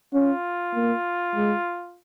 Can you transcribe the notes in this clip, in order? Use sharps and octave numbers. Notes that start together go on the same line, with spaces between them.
C#4 F4
A#3
G#3